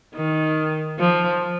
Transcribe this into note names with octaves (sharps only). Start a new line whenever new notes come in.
D#3
F3